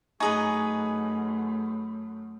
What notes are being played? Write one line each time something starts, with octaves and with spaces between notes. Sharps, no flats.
F#2 A3 D#4 G#4 B4 G#5 C#6 D#6